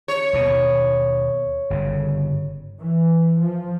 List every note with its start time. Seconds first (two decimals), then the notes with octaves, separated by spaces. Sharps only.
0.08 C#5
0.33 D#2 B2
1.70 G1 C#3
2.79 E3
3.38 F3